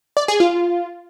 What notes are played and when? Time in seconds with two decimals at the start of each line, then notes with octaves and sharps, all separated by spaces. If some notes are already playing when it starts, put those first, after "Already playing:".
0.17 D5
0.28 G#4
0.40 F4